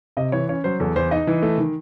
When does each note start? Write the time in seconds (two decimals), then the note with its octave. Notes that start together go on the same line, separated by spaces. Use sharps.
0.17 C3 D#5
0.32 E3 C#5
0.49 C#4 C#5
0.64 F#3 C5
0.80 E2 A4
0.96 E2 C5
1.11 D#4 D#5
1.27 E3
1.42 A3
1.58 D#3